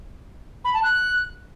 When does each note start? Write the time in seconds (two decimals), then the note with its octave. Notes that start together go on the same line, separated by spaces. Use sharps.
0.65 B5
0.74 A5
0.83 F#6